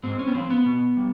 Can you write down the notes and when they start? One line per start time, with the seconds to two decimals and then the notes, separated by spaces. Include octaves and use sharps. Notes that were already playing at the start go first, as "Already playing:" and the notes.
0.03 G#2 C4
0.19 C#4
0.28 B3
0.35 F3 C4
0.50 B3
0.66 B2
0.97 G3